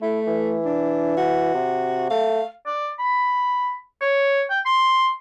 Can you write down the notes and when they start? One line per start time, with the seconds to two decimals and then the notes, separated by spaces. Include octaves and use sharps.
0.02 A3 E4
0.27 E3
0.65 D4
1.17 F#4
1.54 C3
2.10 A3 F5
2.67 D5
2.99 B5
4.01 C#5
4.50 G5
4.66 C6